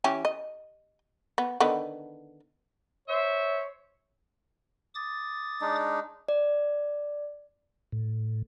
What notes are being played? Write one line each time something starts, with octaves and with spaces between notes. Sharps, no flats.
E3 C#4 G4
D#5
B3
D3 D#3 B3
C5 C#5 E5
D6 D#6 A6
G#3 D4 D#4
D5
A2